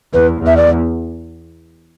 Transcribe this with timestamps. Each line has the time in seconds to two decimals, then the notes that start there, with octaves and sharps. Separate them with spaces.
0.13 E2 B4
0.42 E2 E5
0.57 D5